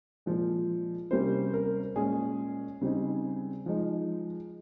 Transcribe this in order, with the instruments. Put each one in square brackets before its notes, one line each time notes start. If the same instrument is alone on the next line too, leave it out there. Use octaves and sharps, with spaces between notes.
[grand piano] A#2 F3 G#3
C3 G3 A#3 C#4 C5
A#4
A#2 G#3 C#4 G#4
C#3 G3 C4 D#4
F3 G#3 D#4